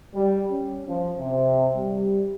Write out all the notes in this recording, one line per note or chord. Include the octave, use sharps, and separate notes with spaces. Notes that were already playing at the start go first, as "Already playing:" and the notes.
G3
C#4
F3
C3
G3